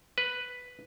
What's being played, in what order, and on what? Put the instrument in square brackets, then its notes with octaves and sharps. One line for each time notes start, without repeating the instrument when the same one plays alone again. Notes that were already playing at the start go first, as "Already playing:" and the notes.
[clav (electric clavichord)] B4